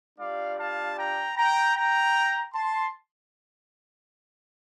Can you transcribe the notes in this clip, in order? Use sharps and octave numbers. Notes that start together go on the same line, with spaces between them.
G3 D4 F4 D5 F5
F5 A5
G5 A#5
G5 A#5
G5 A#5
A5 C6